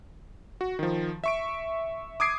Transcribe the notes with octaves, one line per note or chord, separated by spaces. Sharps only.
F#4
D#3 F3
E5 C#6 D7
D6 D#6 G#6 C7 D7